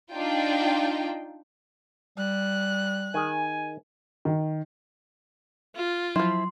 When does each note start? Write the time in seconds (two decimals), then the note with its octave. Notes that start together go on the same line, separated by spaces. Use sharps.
0.11 D4 D#4 F4 G5
2.18 G3 F#6
3.14 D#3 G#4 G#5
4.25 D#3
5.76 F4
6.16 F3 F#3 E4 C6